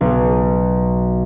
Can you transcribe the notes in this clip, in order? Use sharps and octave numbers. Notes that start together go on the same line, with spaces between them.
B1